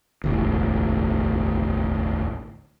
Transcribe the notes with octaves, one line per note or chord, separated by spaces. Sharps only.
E1 A1 D2